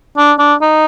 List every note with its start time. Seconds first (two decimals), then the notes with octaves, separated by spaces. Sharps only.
0.17 D4
0.39 D4
0.61 D#4